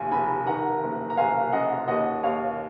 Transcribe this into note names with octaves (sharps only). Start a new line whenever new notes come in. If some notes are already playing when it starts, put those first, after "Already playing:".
Already playing: F1 D#2 G#5
F1 G#5 B5
D#3 F#5 A#5
F#1
A#5
F#1 F5 G#5
F#2 D#5 F#5
D#2 D#5 F#5
D#2 C#5 F5